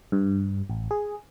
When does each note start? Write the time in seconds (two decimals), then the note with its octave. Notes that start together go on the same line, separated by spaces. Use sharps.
0.12 G2
0.70 A1
0.91 G#4